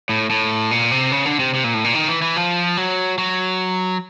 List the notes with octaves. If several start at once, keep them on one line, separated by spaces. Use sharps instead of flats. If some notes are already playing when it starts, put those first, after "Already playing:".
A2
A2
A#2
C3
C#3
D3
C3
C3
A#2
A2
A#2
D#3
E3
E3
F3
F#3
F#3